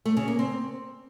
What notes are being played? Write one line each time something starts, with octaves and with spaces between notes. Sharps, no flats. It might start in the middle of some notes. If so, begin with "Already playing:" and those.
A3
C#3
A#3
C4